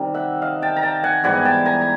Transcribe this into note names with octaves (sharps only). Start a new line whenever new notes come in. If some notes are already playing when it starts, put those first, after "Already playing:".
Already playing: C3 D#3 G3
E5 F#5
D#5 F5
G5 A5
A#5
G5 A5
F#5 G#5
G#2 E3 G3 B3 F#5 G#5
G5 A5
G#5 A#5
A#5